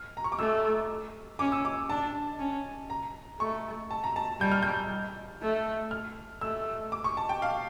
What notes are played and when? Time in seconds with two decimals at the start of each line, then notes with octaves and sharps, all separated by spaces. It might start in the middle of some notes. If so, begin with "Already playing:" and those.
Already playing: F6
0.17 A#5
0.24 C#6
0.32 D6
0.39 A3 E6
1.39 C#4 D6
1.52 E6
1.65 D6
1.89 D4 A5
2.39 C#4
2.90 A#5
3.40 A3 C#6
3.91 A5
4.04 A#5
4.16 A5
4.40 G3 G6
4.52 F6
4.62 G6
5.42 A3
5.91 F6
6.41 A3 E6
6.92 D6
7.04 C#6
7.17 A5
7.29 G5
7.42 F5